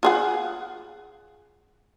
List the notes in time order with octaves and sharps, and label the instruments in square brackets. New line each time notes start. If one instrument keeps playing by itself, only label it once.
[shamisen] F4 G#4 F#5